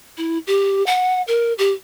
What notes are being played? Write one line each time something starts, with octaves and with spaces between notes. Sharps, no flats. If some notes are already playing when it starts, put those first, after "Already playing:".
E4
G4
F#5
A#4
G4